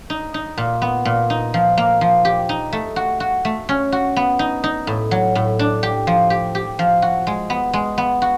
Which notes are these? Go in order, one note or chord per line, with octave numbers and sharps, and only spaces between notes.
D#4
D#4
A#2
B3
A#2
D#4
F3
A#3
F3
G4
D#4
A3
F#4
F#4
A3
C#4
F#4
B3
D#4
D#4
A2
F#3
A2
D4
G4
F3
G4
G4
F3
F#4
G#3
B3
G#3
B3
F#4